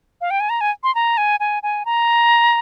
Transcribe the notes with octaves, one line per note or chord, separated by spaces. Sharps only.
F5
G5
G#5
A#5
G#5
C6
A#5
G#5
G#5
G#5
A#5